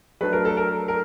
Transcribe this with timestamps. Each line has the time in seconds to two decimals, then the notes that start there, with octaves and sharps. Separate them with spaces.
0.21 F#3 A3 D4 B4
0.33 A#4
0.45 A4
0.57 A#4
0.88 A#4